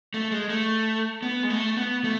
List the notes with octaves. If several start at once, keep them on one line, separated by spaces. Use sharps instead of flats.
A3
G#3
A3
B3
G#3
A3
B3
A3